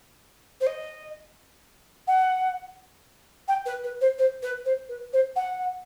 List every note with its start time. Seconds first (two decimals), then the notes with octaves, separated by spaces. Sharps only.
0.60 C5
0.66 D#5
2.07 F#5
3.48 G5
3.65 B4
3.83 B4
4.01 C5
4.18 C5
4.42 B4
4.65 C5
4.88 B4
5.13 C5
5.36 F#5